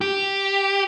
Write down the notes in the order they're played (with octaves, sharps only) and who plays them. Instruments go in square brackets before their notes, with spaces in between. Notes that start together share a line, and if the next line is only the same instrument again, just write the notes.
[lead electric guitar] G4